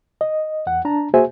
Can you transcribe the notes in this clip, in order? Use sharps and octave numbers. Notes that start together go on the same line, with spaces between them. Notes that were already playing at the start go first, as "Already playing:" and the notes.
D#5
E2 F#5
D4 A5 A#5
A#3 F#4 G#4 C5 E5 G#5